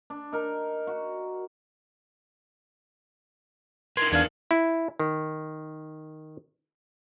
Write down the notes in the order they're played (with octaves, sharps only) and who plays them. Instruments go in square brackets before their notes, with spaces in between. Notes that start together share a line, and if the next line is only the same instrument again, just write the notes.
[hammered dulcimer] D4
D#4 A#4
F#4
[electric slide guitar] D#4 A#4 B4 [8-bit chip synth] C6 [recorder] G#6
[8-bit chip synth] E2 D4 F5 [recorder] G#6
[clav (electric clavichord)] E4
D#3